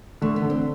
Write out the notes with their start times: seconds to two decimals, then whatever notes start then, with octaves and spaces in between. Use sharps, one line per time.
0.22 D3 A3
0.36 B3
0.42 D3
0.50 C4